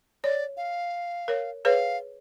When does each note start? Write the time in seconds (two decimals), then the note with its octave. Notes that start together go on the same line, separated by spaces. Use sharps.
0.24 C#5 D5
0.57 F5
1.28 A#4 C#5
1.65 G#4 B4 C#5 F5